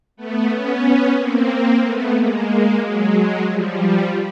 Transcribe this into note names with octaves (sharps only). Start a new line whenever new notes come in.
A3 B3
B3 C#4
A#3 C4
A3 B3
G#3 A#3
F#3 G#3
F3 G3